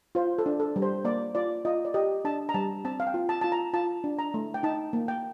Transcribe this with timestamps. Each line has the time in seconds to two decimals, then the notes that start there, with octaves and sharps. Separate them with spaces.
0.15 F4 C5
0.38 A4
0.46 D4
0.60 A4
0.76 G3
0.82 C5
1.05 A#3 D5
1.35 F4 D5
1.65 F4 D#5
1.85 D5
1.94 G4 D#5
2.25 D4 A5
2.49 A#5
2.54 G3 A5
2.85 C4 A5
3.00 F5
3.07 G5
3.14 F4
3.29 A5
3.41 F4 A5
3.52 A#5
3.74 F4 A5
4.04 D4
4.19 A#5
4.34 A3
4.54 G5
4.63 D#4 A5
4.93 A#3
5.08 G5